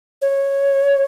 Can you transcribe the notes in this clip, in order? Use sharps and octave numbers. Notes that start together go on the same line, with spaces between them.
C#5